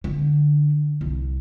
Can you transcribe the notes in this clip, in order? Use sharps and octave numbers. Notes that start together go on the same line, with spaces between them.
D3
C2